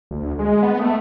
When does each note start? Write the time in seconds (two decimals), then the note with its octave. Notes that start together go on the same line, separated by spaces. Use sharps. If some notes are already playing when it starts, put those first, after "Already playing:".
0.11 D2
0.39 G#3
0.63 B3
0.80 A3